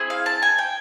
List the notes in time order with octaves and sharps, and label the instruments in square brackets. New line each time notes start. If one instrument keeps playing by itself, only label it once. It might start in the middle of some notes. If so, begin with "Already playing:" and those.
Already playing: [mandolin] C4 E4 G#4
F5
A5
G#5
G5